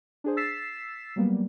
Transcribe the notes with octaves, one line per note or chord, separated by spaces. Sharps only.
D4 G#4 C5
E6 A6 B6 C7 E7
F#3 G3 A#3 B3